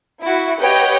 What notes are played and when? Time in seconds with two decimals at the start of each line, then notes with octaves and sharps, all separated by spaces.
0.22 E4 F#4
0.61 G4 B4 C#5 D#5 F#5 G5